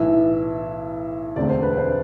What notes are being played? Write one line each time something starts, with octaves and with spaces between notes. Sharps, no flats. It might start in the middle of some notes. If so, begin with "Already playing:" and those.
Already playing: B1 A2 E3 E5
E1 D2 D3 A3 C4 D5
C5
B4
C5